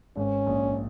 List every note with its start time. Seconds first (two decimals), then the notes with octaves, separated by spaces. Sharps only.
0.17 G#1 G#2 C#4
0.46 A#1 A#2